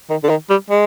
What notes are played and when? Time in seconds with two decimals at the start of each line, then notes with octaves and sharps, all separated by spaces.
0.10 D#3
0.23 D3
0.29 D#3
0.50 G3
0.70 G#3